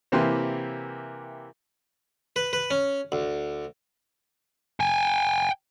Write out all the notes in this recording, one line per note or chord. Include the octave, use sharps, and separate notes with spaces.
C3 E3 A#3 G4 B4 C6
B4
B4
C#4
D2
G5 G#5